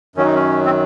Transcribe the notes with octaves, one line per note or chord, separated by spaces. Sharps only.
F#2 D#3 F#3 C#4
D#4
C#4
C4